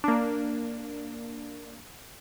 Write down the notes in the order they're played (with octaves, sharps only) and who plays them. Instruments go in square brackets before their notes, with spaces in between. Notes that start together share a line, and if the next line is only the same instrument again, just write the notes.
[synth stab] A#3 D4